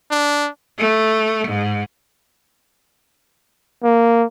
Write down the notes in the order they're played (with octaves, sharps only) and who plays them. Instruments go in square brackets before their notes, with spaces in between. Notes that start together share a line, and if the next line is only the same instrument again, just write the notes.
[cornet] D4
[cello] A3
G#2
[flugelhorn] A#3